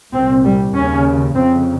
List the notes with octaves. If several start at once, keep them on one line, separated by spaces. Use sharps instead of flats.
C2 A#2 C4
G3
D#2 C#3 C#4
F2 C#3 C4